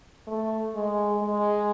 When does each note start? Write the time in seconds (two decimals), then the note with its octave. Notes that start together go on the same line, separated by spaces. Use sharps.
0.27 A3
0.75 G#3
1.22 G#3